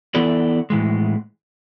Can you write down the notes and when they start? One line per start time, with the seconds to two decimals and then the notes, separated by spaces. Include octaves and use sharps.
0.15 E3 B3 E4 A4 D5
0.70 A2 E3 G#3